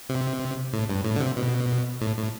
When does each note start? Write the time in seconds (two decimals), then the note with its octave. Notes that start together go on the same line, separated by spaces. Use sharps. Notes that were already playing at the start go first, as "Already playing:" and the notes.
0.09 C3
0.73 A2
0.89 G2
1.05 A2
1.16 D3
1.20 C3
1.37 B2
2.01 A2
2.17 A2